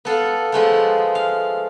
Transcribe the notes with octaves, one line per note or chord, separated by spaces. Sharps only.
B3 A4 F5 F#5
F3 G#3 A3 B3
F5